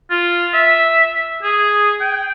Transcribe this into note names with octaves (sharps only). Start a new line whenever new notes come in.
F4
E5
G#4
G5